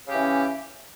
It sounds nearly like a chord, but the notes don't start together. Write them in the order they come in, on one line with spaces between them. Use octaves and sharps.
C#3 G4 E3 C#4